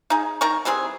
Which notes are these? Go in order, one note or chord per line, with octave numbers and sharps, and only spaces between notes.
D#4 G#4
D#3 A#4 A#5 C#6
E3 G3 C4 G#4